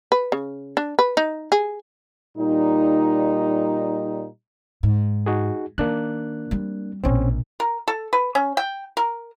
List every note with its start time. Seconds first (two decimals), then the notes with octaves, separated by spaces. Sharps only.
0.12 B4
0.32 C#3
0.77 D4
0.99 B4
1.17 D#4
1.52 G#4
2.36 A#2 G3 D#4
4.83 G#2
5.26 D#4 F#4 G#4
5.78 D#3 A#3 D4 F#6
6.51 G3 C4
7.04 A#1 B2 C4 C#4
7.60 A#4
7.88 A4
8.13 B4
8.35 C#4
8.57 G5
8.97 A#4